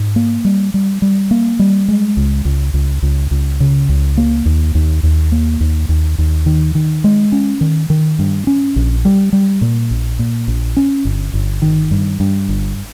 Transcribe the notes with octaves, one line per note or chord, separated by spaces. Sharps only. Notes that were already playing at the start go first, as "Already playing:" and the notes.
Already playing: G#2
A#3
G3
G3
G3
A#3
G3
G#3
C#2
C#2
C#2
C#2
C#2
C#3
C#2
A#3
D#2
D#2
D#2
A#3
D#2
D#2
D#2
D#3
D#3
G#3
C#4
D#3
D#3
G2
C#4
A#1
G3
G3
A#2
A#1
A#2
A#1
C#4
G1
G1
D#3
G2
G2
G1